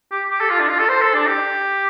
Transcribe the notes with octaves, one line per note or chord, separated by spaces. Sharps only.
G4
G4
A4
F4
D4
F4
A4
C5
A4
D4
G4